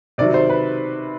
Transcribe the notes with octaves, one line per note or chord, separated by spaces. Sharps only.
C3 D#3 F#3 D5
C5
B4